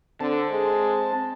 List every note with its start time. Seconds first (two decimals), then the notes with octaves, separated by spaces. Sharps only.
0.20 D3 C4 A5
0.52 G#3